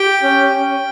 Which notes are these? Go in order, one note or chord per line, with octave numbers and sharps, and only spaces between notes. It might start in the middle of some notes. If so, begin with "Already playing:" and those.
Already playing: G4 G5
C#4
C#4